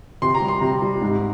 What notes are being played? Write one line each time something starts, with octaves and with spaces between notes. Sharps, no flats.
C3 C6
A#5
G3
C6
C3
G3
G#2